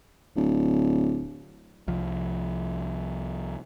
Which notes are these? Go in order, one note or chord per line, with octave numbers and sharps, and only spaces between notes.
D1
C2 F3